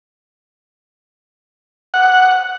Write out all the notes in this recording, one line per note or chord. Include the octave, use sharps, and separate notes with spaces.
F#5